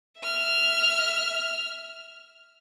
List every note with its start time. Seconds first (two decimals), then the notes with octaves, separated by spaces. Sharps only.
0.21 E5 F6